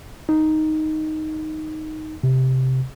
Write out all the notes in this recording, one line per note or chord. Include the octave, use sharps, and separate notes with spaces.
D#4
C3